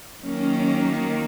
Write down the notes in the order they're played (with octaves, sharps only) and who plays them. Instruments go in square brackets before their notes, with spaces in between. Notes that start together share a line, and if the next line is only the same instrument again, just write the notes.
[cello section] D#3 F#3 A#3 C#4